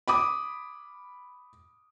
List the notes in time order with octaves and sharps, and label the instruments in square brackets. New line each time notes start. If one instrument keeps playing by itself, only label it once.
[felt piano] B5 D6 D#6